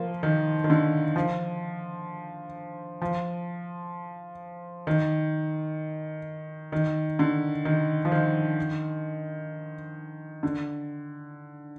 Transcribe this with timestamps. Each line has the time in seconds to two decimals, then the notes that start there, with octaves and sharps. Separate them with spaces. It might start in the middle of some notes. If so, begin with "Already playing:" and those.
Already playing: F3 A#3
0.23 D#3
0.64 D#3
0.70 D3
1.16 F3
3.02 F3
4.87 D#3
6.72 D#3
7.19 D3
7.65 D#3
8.05 F3
8.12 D#3
10.43 D3